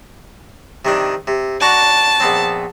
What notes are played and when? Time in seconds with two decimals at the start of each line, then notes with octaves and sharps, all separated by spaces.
0.85 C3 D#3 D4
1.27 C3
1.62 D4 F#4 A5 A#5
2.20 A#1 B3 C4